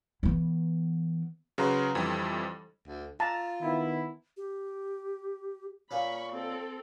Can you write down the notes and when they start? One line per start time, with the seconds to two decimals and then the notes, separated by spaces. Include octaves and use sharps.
0.23 E3 B3
1.58 C#3 F#3 B4 A#5 C6
1.95 F2 D3 E3 G3
2.87 D2
3.20 F4 A5 A#5
3.61 D#3 B3 E4
4.37 G4
5.91 A#2 A#3 C#4 B5 C#6
6.32 C4 A4